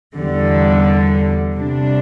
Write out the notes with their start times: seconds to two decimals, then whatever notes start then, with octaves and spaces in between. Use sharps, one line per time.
0.16 E2 D3 G3
1.55 C3 G3 D4